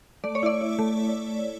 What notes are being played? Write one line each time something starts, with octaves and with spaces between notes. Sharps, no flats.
A3 D5
C#5
E4 D5
E4
A3